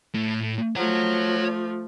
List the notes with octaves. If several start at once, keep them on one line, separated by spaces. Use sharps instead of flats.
A2
F3 A3 C#5 F#5